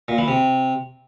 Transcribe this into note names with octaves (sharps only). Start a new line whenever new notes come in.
A#2
E3
C3